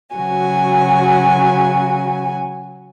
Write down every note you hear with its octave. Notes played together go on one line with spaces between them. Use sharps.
C#3 F#3 F#4 G#5